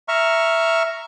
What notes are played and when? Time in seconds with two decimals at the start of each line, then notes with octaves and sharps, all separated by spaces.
0.08 E5 A#5 C#6 F6